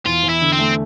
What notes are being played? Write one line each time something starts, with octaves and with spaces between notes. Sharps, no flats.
E2 F4
E2
E4
D3
C4
A3